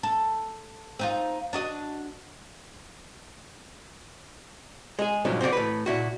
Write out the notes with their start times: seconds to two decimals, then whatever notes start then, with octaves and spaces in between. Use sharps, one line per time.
0.03 A4
0.99 C4 D#4 F4
1.53 D4 F#4 D#5
4.99 G#3 G#4
5.25 G2 A#2 F3 F#3 G#3 D4
5.41 C4 F#4 G4 D5
5.53 A2 B4
5.86 A#2 E4 F#4